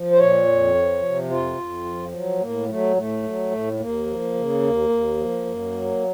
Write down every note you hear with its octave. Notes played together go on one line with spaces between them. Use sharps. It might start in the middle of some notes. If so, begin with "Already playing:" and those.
Already playing: F3
C5
A#2 C#5
F2
F3
C3
F2 F4
F2
F3
F#3
A2 A#3
F#3 A3
A2 A3
F#3
A2
A3
D#2 A#3
F3
C#3
D#2
D#2
F3
F#2
F#3